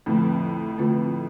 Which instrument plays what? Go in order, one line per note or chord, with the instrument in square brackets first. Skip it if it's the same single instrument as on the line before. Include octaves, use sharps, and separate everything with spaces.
[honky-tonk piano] F2 A2 [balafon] D3 A3 C4
[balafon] D3 A3 C4 F4